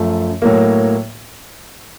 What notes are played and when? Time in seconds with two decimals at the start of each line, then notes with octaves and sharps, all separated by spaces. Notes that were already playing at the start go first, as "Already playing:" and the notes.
Already playing: F#2 F3 A3
0.42 A2 F#3 A#3